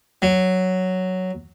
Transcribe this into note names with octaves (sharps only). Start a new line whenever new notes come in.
F#3